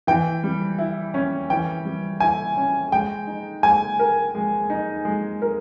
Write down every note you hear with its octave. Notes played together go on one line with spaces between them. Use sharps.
E3 G5
G3
E4
C#4
E3 G5
G3
E4 G#5
C#4
G#3 G5
D#4
G#3 G#5
A#4
G#3
D#4
G#3
A#4